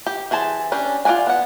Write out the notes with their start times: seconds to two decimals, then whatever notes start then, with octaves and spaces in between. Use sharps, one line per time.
0.07 G4
0.31 E3 G#4 C5 A5
0.72 C#4 D4 G4
1.05 F4 A#4 D5 F#5 G#5
1.27 B3 F#5